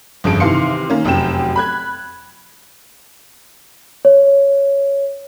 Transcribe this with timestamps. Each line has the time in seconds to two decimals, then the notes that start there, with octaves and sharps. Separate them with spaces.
0.24 G1 F2 C#3 D7
0.40 C3 D#3 E3 F5 C6 C#7
0.90 D#3 A#3 C#4
1.04 F1 F#2 F#3 G5 E7
1.56 B5 F#6 G#6
4.05 C#5